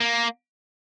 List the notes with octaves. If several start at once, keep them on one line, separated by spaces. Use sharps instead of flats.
A#3